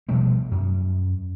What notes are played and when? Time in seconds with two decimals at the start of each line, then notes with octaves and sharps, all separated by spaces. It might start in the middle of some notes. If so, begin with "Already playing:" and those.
0.09 B2 F3 G3 A3
0.51 F#2